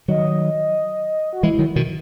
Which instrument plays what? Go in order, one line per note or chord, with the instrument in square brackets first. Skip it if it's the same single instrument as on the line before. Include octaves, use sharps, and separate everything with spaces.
[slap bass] D#3 F#3 [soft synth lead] D#5
[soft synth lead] F#4
[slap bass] E3 G#3 [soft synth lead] E4
[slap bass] D#3 F#3
B2 D#3